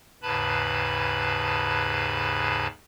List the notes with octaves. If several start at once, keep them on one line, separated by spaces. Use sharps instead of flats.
D#2 G#2 C#3 B4 A5 B5